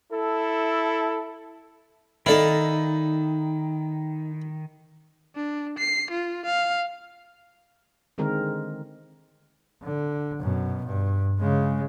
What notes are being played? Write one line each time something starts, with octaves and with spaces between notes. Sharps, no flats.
E4 A4
D#3 D#4 E4 A4 D5 F5 A5
D4
C7
F4
F5
D3 D#3 G#3 C4 A#4
D3
F#2 B2
G2
C#3 G#3